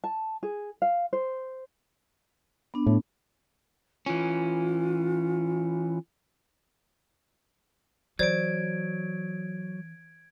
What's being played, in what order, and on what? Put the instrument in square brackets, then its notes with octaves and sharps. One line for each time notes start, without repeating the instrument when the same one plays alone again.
[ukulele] A5
G#4
F5
C5
[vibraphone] B3 D4
[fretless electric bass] A2
[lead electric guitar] E3 C#4 [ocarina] F4
[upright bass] E3 [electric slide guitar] F#3 [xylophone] C5 D5 [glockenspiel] G#6 D7